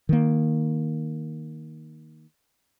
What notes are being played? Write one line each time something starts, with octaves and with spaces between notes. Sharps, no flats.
D#3 A#3